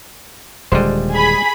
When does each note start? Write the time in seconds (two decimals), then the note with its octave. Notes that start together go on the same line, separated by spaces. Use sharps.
0.72 D#1 D3 G3 G#3 C5
1.11 G#4 B5